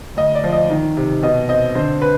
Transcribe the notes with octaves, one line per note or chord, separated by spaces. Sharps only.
D2 D#5
D5
F3
D#5
D#3
C3
B2 D#5
C4 D#5
D3 C5
B4